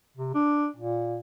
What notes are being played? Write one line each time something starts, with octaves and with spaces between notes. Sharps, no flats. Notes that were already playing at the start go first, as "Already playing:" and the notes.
C3
D4
A#2